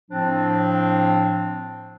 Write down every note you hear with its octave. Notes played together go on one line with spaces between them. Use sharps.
A2 F3 C4 D4